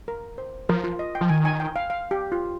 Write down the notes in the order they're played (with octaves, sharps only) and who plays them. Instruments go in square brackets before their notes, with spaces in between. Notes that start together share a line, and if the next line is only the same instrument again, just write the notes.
[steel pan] A#4
C5
[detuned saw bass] F3 [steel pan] A#4
[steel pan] F4
D#5
G5
[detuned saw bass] F3
[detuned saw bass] D#3 [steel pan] G#5
[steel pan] G#5
G5
F5
F5
G4
F4